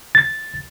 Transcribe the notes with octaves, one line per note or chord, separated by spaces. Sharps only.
A6